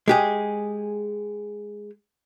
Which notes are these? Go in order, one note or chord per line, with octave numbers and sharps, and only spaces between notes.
G#3 G4 G#4